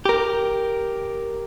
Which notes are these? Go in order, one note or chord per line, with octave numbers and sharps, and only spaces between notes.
G4 A#4